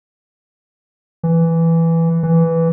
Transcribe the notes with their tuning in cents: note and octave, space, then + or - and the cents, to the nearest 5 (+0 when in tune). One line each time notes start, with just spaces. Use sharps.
E3 +5
E3 +0